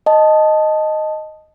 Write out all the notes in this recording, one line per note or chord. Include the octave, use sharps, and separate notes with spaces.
D#5 A5